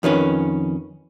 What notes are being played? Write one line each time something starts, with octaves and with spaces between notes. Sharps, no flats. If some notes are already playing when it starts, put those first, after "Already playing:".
F2 D#3 C#4 B4